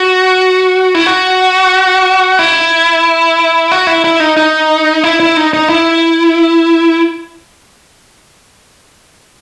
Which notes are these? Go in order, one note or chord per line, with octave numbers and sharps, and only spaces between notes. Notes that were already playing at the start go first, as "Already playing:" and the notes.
Already playing: F#4
E4
F#4
E4
F#4
E4
E4
D#4
D#4
E4
E4
D#4
D#4
E4